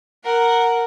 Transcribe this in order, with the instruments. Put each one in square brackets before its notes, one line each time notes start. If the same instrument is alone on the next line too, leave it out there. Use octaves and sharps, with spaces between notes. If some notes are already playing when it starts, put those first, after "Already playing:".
[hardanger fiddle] A#4 F#5